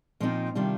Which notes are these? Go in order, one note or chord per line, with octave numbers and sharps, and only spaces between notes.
A#2 F3 C4 D#4
C3 D#3 G3 D4 F4